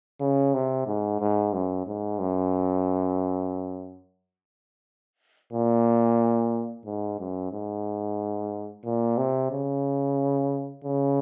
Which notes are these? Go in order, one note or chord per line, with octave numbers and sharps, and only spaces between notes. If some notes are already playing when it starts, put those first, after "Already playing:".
C#3
C3
G#2
G#2
F#2
G#2
F#2
A#2
G#2
F#2
G#2
A#2
C3
C#3
C#3